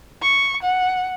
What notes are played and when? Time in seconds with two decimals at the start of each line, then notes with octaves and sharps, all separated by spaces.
0.22 C#6
0.62 F#5